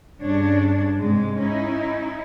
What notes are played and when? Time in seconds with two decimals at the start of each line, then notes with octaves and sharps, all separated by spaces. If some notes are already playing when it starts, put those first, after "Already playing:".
0.22 G2 C#3 D4 C#5
0.97 G#2 C3 G#3
1.40 C#4 D#4 E4